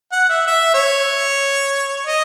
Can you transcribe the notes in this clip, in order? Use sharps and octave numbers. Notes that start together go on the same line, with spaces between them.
F#5
E5
E5
C#5
D#5